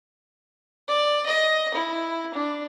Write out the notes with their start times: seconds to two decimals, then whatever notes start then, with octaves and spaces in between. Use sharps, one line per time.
0.88 D5
1.26 D#5
1.74 E4
2.34 D4